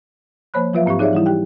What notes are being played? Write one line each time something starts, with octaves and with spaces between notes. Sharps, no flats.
F3 A#3 C5 C#5 B5 F#6
F3 F#3 F4 B4 E5 F5
G#2 C4 G4 F5 C#6
D#4 G#4 C#5 D5 E5 F5
E3 G3 E4
G4 G5